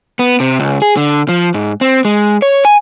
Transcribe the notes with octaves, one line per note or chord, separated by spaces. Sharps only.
B3
C3
C#2
G#4
D3
F3
G#2
C4
G#3
C#5
G#5